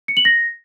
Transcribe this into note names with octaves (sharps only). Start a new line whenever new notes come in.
C#7
F#7
A#6